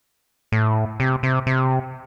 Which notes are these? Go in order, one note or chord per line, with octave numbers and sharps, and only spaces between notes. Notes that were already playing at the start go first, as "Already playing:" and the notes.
A2
C3
C3
C3